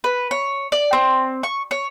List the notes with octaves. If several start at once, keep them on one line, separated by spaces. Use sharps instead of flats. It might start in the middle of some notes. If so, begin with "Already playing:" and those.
B4
C#5
D5
C4
C#6
C#5